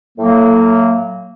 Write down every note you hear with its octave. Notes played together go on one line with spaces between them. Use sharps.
A2 F#3 A#3